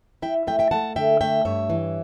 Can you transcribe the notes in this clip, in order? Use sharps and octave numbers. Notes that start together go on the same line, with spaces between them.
E4 E5 G5
A3 E5 G5
E5 G5
A3 F#5 A5
D3 E5 G5
A3 E5 G5
G2 C#5 E5
E3